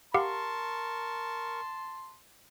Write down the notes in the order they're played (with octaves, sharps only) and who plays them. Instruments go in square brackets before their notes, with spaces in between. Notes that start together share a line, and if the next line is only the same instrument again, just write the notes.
[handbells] G4 F5 F#5 [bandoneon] A#4 C#6 [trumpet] A5 [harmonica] C6